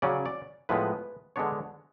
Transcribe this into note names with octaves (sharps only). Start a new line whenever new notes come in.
C#3 F#3 C#4 D5
D5
A2 F3 G#3 B3 B4
D3 G#3 B3 D4 C#5